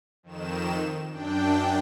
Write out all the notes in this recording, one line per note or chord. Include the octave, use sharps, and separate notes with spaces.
F2 D#3 E7
F#2 D4 G5